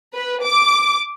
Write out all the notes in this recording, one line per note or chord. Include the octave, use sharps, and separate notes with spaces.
B4
D6